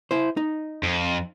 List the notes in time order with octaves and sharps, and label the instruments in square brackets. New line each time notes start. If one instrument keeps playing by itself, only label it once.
[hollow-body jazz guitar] E4 C5
D#4
[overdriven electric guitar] F2